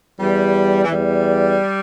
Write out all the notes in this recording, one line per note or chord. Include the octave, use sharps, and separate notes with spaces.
E2 G3
E3
E2 G3